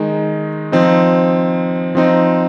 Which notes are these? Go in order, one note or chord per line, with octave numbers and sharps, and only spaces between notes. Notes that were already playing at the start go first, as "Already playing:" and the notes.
Already playing: D#3 G#3 D#4
F3 C4 D#4
F3 C4 D#4